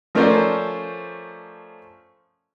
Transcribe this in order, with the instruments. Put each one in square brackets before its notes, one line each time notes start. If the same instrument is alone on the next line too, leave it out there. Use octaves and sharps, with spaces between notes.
[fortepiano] F3 A3 C#4 A#4 C5 D5